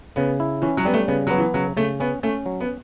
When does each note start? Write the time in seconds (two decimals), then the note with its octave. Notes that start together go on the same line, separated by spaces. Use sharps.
0.16 C#3 B3
0.40 E4
0.62 E3 C#4
0.77 F#3
0.85 G3 B3
0.94 A3
1.08 C#3 B3
1.27 F#3 B3
1.38 E3
1.54 C#3 F#3
1.77 C#3 A3
2.00 B3 C#4
2.23 A3 C#4
2.46 F#3
2.60 B3